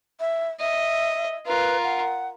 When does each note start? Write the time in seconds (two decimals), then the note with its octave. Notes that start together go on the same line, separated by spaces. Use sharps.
0.20 E5
0.60 D#5 E5
1.46 F4 A#4 B4
1.83 F#5